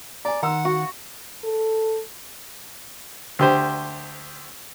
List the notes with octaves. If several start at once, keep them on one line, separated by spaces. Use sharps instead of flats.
D5 G#5 A#5
D#3 F#5 A#5 C6 E6
F#4
A4
D2 G4 C5